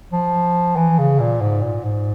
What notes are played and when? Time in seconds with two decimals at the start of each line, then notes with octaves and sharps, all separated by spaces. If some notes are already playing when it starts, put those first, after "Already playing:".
0.12 F3
0.76 E3
0.98 C#3
1.20 A#2
1.41 G#2
1.63 A#2
1.84 G#2